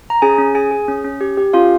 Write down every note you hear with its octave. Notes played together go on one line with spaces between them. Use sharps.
A#5
C#4 G#4 G#5
C#4
G#4 G#5
G#4
C#4
C#4
G4
G4
C#4 F4 F5